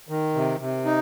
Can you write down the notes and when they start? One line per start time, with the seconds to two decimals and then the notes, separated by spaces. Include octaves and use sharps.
0.09 D#3
0.35 C3
0.60 C3
0.85 D#4